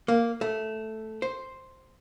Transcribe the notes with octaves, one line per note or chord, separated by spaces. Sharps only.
A#3
A3
C5